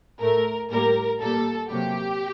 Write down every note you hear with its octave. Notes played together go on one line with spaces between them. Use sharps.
A2 A3 A#4
A2 G3 A#3 A#4
A#2 G3 A#3 A4
C3 F#3 A#3 G4